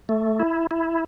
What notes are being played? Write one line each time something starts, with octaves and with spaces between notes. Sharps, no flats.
A3
E4
E4